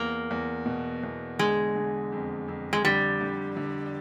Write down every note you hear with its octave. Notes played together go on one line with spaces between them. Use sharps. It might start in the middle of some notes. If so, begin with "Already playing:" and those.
Already playing: E2 A#3
E2
B2
E2
D3 G#3
D3
F2
F2
G#3
D3 G3
D3
D3